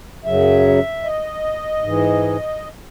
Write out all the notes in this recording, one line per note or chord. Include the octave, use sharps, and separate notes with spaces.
F#2 C#3 F#3 E5
D#5
G#2 E3